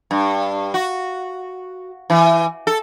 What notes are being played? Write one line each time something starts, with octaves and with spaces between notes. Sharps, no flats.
G2
F#4
E3
A4